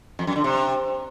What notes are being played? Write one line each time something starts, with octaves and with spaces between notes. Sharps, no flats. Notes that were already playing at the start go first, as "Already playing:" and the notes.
F2
F#2
D3
C3